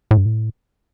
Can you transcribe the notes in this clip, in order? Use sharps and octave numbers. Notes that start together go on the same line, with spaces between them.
A2
G2
A2